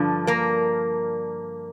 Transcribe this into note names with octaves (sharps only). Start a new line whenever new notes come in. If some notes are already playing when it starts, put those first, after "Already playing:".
Already playing: G2 D3 F3
A#3 A#4